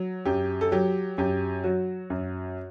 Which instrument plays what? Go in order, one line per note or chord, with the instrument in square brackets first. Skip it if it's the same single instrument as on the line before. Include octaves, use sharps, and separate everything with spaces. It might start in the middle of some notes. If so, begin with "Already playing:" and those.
Already playing: [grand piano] F#3
F#2 G4
A4
F#3 G4
F#2 G4
F#3 F#4
F#2